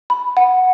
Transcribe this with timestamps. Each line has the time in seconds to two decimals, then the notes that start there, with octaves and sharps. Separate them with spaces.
0.10 B5
0.37 F#5